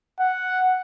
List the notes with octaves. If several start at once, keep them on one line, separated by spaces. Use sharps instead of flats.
F#5